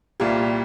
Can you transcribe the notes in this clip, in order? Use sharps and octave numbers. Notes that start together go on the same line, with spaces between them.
C2 A#2 G3 F4